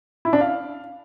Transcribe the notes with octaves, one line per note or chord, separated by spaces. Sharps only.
E4
D4
F5